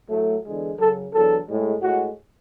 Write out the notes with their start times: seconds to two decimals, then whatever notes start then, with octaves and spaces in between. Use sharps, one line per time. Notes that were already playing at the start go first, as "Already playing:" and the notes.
0.09 A2 F#3 A3
0.43 E2 D3 G#3
0.78 F#2 C#3 F#3 A4
1.12 E2 D3 F#3 A4
1.47 A2 G#3
1.82 A2 G#3 F#4